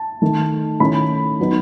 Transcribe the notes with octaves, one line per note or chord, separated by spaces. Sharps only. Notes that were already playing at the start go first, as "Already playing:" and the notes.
Already playing: A5
D#3 A3 D#4
D#3 A3 C#4 E4 B5
F#3 B3 D#4